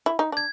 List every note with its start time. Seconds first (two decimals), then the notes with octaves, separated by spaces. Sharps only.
0.06 E4
0.19 D#4
0.32 D4 G#6